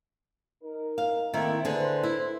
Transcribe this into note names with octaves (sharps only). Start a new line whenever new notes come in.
D#4 A#4
F5
D#3 A3 A#3 C4 E4
D3 G#4 B4 C5
E4